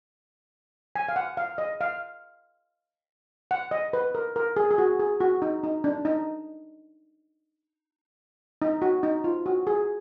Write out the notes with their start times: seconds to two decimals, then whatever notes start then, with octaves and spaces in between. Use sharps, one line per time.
0.96 G#5
1.09 F5
1.16 F#5
1.37 F5
1.58 D#5
1.81 F5
3.51 F#5
3.71 D#5
3.93 B4
4.15 A#4
4.36 A#4
4.56 G#4
4.71 G#4
4.78 F#4
4.99 G#4
5.21 F#4
5.42 D#4
5.64 D#4
5.84 D4
6.05 D#4
8.62 D#4
8.82 F#4
9.03 D#4
9.24 F4
9.46 F#4
9.67 G#4